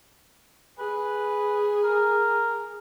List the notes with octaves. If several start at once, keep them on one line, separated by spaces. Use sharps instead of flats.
G#4 B4
A#4